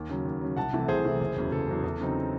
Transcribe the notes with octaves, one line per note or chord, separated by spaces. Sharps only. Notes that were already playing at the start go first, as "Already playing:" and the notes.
Already playing: D#2
C#3 F#3
D#2
C#3 F#3
C2 F#5 A5
C3 E3 A3
C2 G#4 C5
C3 E3 A3
F#1
E2 C#3 F#3
F#1 A4
E2 C#3 F#3
E2
C#3 F#3 C4 D#4